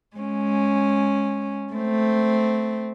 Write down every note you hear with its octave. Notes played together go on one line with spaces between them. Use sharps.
G#3 C#4
A3 C4